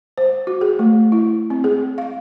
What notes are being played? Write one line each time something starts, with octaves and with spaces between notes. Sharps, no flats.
C5
F#4
G#4
A3
E4
C4
G#4
F5